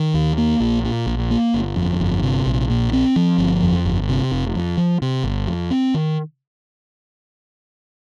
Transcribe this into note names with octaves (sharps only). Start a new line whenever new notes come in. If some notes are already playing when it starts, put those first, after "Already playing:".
Already playing: D#3
D#2
A#3
A#1
A#2
A#1
A#3
G1
F2
G1
C3
A#1
A#2
C4
F3
G1
F2
G1
C3
F1
F2
F3
C3
G1
F2
C4
D#3